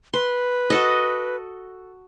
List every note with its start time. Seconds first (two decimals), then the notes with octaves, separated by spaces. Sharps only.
0.13 B4 C6
0.70 F#4 A4 D#5